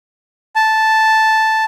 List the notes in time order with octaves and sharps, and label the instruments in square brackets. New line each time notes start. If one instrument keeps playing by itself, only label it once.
[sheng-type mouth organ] A5